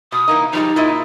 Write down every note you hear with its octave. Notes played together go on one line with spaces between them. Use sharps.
B2 D#6
E3 A#3 D#4
F3 G3 G#3 D#4
A#2 E4 D#5